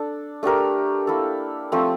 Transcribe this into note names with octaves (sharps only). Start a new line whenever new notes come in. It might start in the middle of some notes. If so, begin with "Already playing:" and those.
Already playing: D4 A4
A3 D4 G4 A#4
A#3 E4 A4
F3 A3 C4